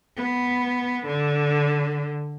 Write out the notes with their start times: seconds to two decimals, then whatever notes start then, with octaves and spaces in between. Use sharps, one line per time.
0.17 B3
1.06 D3